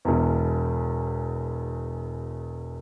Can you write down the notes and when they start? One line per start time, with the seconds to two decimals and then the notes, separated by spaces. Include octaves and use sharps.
0.05 E1 E2